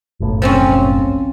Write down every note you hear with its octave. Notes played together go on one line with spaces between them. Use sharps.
F#1 B1 A2
F3 C4 C#4